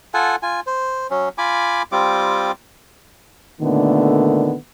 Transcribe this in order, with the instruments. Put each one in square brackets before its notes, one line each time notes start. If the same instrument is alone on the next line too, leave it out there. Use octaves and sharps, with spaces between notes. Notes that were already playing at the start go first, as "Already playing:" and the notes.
[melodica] F4 A4 F#5 G#5
F4 G#5
C5
F#3 C#4
F4 G#5 B5 D6
G3 C4 F4 D6
[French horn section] A#2 D3 D#3 A3 B3